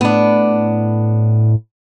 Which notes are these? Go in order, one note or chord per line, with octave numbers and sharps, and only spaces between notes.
A2 B3 D4